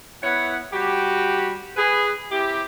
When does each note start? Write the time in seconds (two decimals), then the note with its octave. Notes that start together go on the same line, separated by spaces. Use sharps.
0.23 B3 E4 B4 C#5 F#5
0.72 G3 F#4 G4
1.76 G#4 B4
2.31 C4 E4 G4